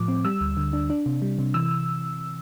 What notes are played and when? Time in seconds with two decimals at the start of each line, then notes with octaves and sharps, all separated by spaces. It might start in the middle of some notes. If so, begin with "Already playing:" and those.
Already playing: A2 F3 D6
0.08 C4
0.25 G3 E6
0.41 D2
0.57 D3
0.73 D4
0.90 D4
1.06 C3
1.22 G3
1.39 C3
1.54 E3 E6